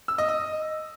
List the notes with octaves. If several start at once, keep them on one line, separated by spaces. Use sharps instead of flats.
E6
D#5
D#5